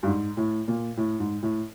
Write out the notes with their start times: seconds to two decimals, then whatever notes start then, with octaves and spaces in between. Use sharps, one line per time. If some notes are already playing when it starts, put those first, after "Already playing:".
0.03 G2
0.07 G#2
0.37 A2
0.68 A#2
0.97 A2
1.20 G#2
1.42 A2